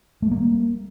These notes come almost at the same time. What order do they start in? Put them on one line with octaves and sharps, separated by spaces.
A3 G3 A#3